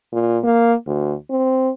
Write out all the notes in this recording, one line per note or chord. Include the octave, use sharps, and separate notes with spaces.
A#2
A#3
D2
C4